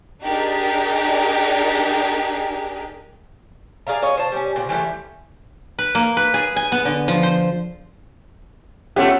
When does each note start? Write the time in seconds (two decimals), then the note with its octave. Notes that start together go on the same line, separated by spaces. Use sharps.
0.21 D4 D#4 G4 G#4 A#4
3.87 G#4 D5 F5 A#5
4.02 F4 C#5 D#5
4.17 C5 A5
4.32 G3 C#4
4.56 A#2 C#3 C4
4.69 E3 F3 G3 A3
5.79 B4
5.95 A#3
6.17 B4
6.34 G#4
6.56 G#5
6.72 B3
6.85 D3
7.08 F3
7.23 C5
8.96 A3 B3 C#4 F4 G4